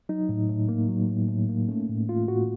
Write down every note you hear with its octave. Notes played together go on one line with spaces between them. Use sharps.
F#3 D#4
A2
A2
A#3
F#3
A2
A2
A#3
A3 C#4
A2
A3 F4
A2 F#4